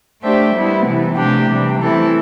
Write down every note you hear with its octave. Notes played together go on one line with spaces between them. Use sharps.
A3 D4 G4 C5 E5
G3 B3 E4
C3 E3 B3
C3 F3 A3 D4 G4
C3 E3 G3 D4
E3 A3 C4 E4 A4